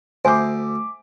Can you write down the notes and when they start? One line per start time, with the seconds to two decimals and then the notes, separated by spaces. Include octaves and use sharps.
0.25 D2 C5 E5 G#5 D6